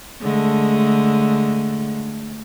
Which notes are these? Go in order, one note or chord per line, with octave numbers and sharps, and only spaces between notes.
D3 G#3 A3